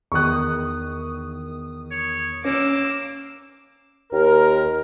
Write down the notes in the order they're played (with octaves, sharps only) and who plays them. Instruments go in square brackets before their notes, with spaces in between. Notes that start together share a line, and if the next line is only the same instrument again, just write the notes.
[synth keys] E2 D#3 D#6 [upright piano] C#6 F#6
[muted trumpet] C#5
[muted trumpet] A#3 [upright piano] C#4 [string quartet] D6 E6
[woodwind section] D#2 A#4